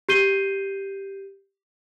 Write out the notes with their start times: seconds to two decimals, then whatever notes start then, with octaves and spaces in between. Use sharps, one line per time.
0.09 G4 G6 C7 D#7 G7